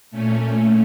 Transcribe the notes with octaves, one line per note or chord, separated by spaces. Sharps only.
A#2 A3 C#4